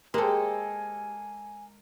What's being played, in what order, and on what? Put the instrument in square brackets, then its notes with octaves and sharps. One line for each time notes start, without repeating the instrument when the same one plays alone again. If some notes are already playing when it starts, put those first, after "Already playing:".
[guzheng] G#3 [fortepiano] A#3 A4 [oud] G4 C5 [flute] G#5